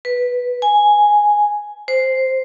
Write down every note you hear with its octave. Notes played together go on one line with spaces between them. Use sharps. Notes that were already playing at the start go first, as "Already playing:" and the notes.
B4
G#5
C5